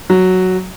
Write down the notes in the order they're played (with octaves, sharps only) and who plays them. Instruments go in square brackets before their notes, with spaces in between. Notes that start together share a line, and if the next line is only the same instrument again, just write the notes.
[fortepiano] F#3